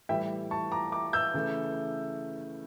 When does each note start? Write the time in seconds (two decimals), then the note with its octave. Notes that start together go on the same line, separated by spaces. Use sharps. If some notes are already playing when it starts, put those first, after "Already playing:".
0.09 A2 E3 G3 E5 G5
0.51 A5 C#6
0.72 A#5 D6
0.92 A#5 D6
1.13 E6 G6
1.34 C#3 E3 A3